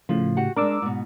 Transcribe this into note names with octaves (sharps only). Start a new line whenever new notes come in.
A2 C#3 F3
F#4 G4 F#5
G#3 D4 A#4 D6 E6
G#2 B2